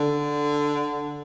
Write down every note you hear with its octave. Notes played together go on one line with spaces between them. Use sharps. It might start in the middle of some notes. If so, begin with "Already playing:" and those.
Already playing: D3